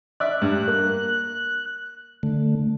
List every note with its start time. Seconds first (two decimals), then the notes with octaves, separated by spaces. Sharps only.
0.20 D5 E5 F#6
0.42 G2
0.68 A#3
2.23 D3 A3